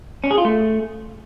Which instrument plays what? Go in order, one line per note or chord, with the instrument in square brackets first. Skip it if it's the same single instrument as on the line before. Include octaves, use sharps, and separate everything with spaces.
[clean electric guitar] C#4
G#4
F4
A3